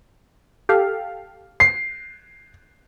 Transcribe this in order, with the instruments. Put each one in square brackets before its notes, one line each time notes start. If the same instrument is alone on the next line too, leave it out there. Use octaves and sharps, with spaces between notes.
[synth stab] G4 A4 F5
[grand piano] C7